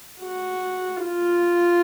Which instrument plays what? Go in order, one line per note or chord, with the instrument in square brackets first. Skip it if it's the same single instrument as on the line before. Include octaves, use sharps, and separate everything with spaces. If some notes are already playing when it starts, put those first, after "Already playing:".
[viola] F#4
F4